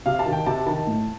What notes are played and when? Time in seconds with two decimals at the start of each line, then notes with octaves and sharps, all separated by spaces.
0.06 C3 F5
0.19 A5
0.26 D#3
0.33 G5
0.46 C3 A5
0.66 D#3 A5
0.87 A2